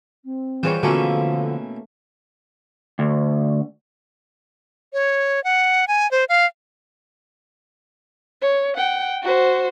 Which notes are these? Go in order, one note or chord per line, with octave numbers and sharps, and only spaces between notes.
C4
E3 F3 G3 B3 G#4 C#5
B2 D3 E3 F3 A3 A#3 C#4
D2
C#5
F#5
G#5
C5
F5
C#5
F#5 G5
F#4 C5